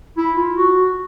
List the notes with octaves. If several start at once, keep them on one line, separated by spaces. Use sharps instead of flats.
E4
F4
F#4